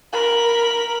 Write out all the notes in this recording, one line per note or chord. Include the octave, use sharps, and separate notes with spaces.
A#4 B5